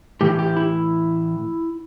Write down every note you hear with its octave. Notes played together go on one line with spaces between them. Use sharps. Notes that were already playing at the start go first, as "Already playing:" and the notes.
A2 E3 G4
G4
E4